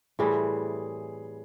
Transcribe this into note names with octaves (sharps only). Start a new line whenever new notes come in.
A2 E3 G3 C4 G#4